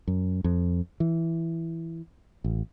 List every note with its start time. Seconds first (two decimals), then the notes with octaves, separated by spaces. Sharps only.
0.08 F#2
0.44 F2
1.00 E3
2.44 A1